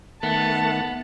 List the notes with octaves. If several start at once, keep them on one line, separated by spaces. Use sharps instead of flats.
D#3 A3 B3 F#5 A5